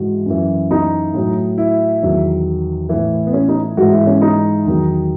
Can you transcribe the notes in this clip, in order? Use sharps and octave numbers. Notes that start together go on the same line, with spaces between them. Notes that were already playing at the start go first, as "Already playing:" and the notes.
Already playing: G#2 E3 F#4
F#2 E3
D#4
A2 F#3
E4
E2 D#3 F#3
A2 E3
B3
C#4
D#4
G#2 E3 F#4
E4
C#4
D#4
E2 D#3 F#3